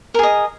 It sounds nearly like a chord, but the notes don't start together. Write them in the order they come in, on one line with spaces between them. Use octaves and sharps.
A#4 G#4 D#5